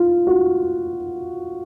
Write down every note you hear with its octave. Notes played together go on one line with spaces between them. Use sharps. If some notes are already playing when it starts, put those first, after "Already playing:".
Already playing: F4
F#4